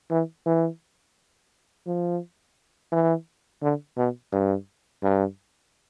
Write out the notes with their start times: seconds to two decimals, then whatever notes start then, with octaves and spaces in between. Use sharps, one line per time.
0.11 E3
0.46 E3
1.86 F3
2.92 E3
3.62 D3
3.97 B2
4.32 G2
5.03 G2